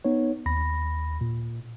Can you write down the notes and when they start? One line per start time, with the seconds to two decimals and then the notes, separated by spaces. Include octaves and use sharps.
0.05 B3 D#4 C#5
0.46 D#2 B5 A#6
1.21 A#2